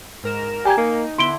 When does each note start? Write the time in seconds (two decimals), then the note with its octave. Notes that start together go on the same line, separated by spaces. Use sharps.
0.24 G#2 A#4 E7
0.65 G4 G#5 A#5 G#6
0.77 A#3 D#4
1.18 D3 B3 E4 C6 D7 G7